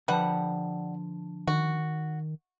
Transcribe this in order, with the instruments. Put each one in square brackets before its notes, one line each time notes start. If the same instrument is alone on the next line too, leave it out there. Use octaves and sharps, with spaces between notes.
[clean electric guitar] D3 F3 A5 [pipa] G3 B4 F#5
[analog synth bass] D#3 [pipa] F#4